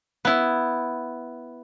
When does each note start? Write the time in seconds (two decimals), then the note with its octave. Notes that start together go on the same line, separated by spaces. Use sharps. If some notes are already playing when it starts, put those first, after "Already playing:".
0.25 B3 E4